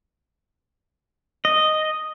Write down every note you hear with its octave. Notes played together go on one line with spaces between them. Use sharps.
D#5